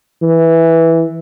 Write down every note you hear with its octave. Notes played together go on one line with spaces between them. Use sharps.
E3